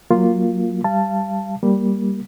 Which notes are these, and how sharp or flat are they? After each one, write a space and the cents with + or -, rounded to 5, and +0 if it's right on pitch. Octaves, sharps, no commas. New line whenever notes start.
F#3 +0 A#3 +0 F4 +0
G3 +0 F5 -25 A5 +0
G3 +0 A#3 +5